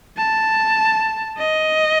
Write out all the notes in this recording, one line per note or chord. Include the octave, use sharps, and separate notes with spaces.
A5
D#5